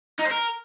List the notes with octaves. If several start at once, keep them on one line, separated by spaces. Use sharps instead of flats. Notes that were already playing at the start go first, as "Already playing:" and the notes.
D#4
C5
A#4